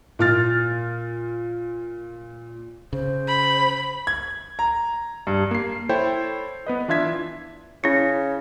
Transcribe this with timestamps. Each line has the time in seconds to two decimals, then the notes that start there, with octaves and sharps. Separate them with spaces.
0.19 A#2 F6 A6
2.93 C#3 C5
3.27 B5
4.07 G#6
4.59 A#5
5.27 G2
5.51 A#3 C7
5.89 E4 A4 C5 C#5 G5
6.67 B3 B4 D#5
6.88 E3 D4 F4 E5 G#6 B6
7.84 C#3 C#4 E4